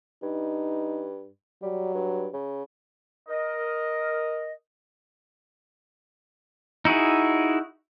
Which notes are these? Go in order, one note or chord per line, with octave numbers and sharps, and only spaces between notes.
G2 D#4
F#3 G3
G2
C#3
A#4 D#5
D#4 E4 F#4 G#4